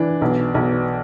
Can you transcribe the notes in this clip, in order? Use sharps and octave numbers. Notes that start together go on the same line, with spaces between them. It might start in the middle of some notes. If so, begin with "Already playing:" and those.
Already playing: E3 D4
B1
B1